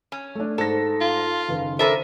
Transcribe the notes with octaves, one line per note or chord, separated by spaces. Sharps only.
C#4
A3 D4
G#2 A4 C5 A#6
F4
F#1 D#3 B4
D4 A4 A#4 C5 E5 B5 D#7